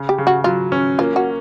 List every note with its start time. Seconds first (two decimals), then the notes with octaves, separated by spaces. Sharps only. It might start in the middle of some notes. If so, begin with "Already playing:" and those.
Already playing: C#3
0.09 G4
0.18 C#3
0.27 F#4
0.44 F#3 F4
0.72 C#4
0.98 A#3 F4
1.16 F#4